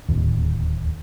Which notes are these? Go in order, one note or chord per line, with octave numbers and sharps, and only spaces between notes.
D1 D#2